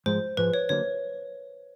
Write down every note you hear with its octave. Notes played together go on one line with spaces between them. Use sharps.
G#2 F3 G#3 C5
G#2 F3 G#3 B4
C#5
D3 F#3 A#3 C#5